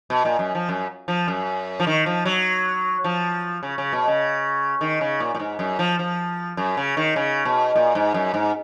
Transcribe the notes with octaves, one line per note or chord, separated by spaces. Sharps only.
B2
A#2
F#2
F3
F#2
F3
F#2
F3
D#3
F3
F#3
F3
C#3
C#3
B2
C#3
D#3
C#3
A#2
A#2
G#2
F#2
F3
F3
F#2
C#3
D#3
C#3
B2
A#2
G#2
F#2
G#2